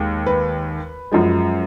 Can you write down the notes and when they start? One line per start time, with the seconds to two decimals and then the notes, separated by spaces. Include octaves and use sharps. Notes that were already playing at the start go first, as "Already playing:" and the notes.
Already playing: D#2 G#3
0.26 B4
1.12 F#2 F3 G#3